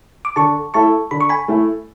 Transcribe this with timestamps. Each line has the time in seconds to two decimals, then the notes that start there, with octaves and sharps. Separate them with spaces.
0.25 D6
0.36 D3 A5 C#6
0.74 A3 E4 A4 A5 C#6
1.11 D3 B5
1.21 C#6
1.29 G#5 B5
1.48 A3 E4 A4